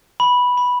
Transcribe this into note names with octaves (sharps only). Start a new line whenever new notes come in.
B5
B5